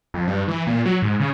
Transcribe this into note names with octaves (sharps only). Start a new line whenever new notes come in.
F2
G2
E3
A#2
F#3
G#2
C#3